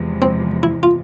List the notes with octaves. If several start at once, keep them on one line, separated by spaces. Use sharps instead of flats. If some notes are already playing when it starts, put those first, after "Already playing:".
Already playing: E2 C3 F3 G#3
C4
E4
F4